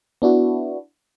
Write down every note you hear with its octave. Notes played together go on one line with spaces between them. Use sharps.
B3 D4 E4 F#4